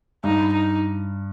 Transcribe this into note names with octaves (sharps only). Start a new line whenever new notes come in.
G2 D#4
D#4